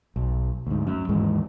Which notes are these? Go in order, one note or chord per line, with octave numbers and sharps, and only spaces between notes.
B1
D2 G#2
F#2
D#2 G#2 E3 G#3